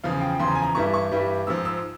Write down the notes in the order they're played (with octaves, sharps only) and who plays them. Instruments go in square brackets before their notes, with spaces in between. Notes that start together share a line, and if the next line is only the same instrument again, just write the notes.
[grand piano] E2 C#3 F3 F5
G5
E2 C#3 F3 C6
A#5
G#5
A#5
G2 E3 G3 C#6
C#6
G2 E3 G3
G#2 F3 E6
E6